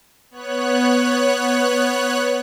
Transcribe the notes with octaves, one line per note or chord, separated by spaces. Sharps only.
B3 C#5 F#6